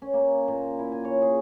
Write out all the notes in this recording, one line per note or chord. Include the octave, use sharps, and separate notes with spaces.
C#4
A#3
A#2
E4
G#5
C#5
G#4